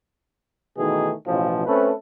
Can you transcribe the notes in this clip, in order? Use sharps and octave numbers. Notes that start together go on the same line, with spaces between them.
B2 D#3 E3 A3 D#4 G#4
A1 B2 F3
A3 C4 C#4 A4 B4